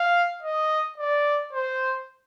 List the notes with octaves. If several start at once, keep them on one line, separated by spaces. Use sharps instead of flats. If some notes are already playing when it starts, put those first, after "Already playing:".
Already playing: F5
D#5
D5
C5